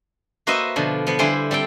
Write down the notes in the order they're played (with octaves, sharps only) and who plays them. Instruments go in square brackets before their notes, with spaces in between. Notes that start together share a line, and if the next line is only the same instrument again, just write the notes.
[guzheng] A#3 F#4 B4 C5 D#5 E5
B2 D3 F3
F3 B3
D3 G3 E4 C5 G5 G#5
G3 C4 A4 G5